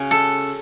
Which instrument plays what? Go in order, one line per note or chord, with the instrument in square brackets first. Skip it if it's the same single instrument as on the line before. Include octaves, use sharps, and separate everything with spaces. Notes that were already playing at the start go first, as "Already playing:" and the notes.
Already playing: [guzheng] C#3 C#4 F#4
A4